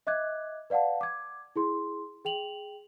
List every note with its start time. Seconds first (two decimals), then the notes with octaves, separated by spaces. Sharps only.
0.07 D#5 E5 D6 F#6 G#6
0.70 B4 D5 F5 F#5 A5
1.01 D6 G#6
1.56 E4 G#4 C6
2.25 G#4 G5 F7 F#7